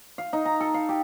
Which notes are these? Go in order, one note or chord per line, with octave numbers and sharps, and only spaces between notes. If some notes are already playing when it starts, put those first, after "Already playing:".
F5
D#4
A#5
A4
F5
G4